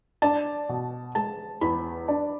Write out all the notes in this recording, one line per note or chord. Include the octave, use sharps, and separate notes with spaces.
D4 A5
B2
G#3 A5
E2 B5
D4